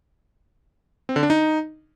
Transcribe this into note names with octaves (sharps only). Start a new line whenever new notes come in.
C4
D3
D4
D#4